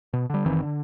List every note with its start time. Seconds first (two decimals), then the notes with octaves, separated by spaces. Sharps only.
0.13 B2
0.30 D3 G3
0.46 F#1 D#3 E3 C4
0.62 D3